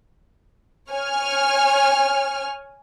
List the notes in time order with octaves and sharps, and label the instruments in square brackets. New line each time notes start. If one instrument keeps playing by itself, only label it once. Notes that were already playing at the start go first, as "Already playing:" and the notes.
[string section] C#5 G#5 F6